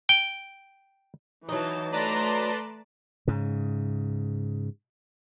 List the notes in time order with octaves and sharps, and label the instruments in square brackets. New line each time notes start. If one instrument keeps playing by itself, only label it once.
[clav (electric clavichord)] G5
[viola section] E3 A5 [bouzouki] F#3 D#4
[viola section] A3 A#5 C6 [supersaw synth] B4 D5 A5
[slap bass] G#2 C#3